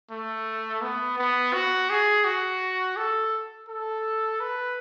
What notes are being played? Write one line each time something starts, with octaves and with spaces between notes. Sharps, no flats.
A3
B3
B3
F#4
G#4
F#4
A4
A4
B4